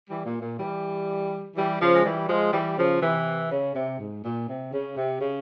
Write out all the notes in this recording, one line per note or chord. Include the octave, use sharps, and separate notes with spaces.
E3 G3
A#2
A#2
E3 G3
E3 G3
C#3 F3
G#3
E3 G3
F3 G#3
E3 G3
C#3 F3
C3 E3
C#3
C3
G#2
A#2
C3
C#3
C3
C#3